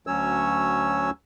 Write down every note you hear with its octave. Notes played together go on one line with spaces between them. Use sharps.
D2 F#3 C#4 C#5 E6